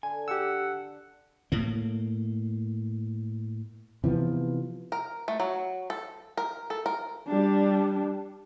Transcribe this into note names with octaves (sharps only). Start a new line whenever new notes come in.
D3 G#5
G4 F#5 E6
A2 A#3
C3 E3 F3 B3
A#4
A3
F#3
A4
A#4
A4
A#4
G3 D4